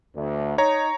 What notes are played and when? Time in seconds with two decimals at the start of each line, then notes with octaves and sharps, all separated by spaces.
0.16 D2
0.58 D#4 C#5 A#5